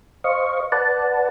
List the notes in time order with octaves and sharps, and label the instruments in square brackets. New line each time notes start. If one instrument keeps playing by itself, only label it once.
[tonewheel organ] C5 D#5 F5 C#6
B4 D5 F#5 A5